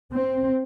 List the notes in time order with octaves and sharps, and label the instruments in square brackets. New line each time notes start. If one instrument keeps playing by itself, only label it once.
[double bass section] C4